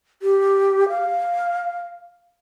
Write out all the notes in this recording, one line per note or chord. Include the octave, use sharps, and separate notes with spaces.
G4
F5